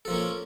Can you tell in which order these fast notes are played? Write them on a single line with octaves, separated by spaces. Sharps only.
A4 F3 A#3 C#4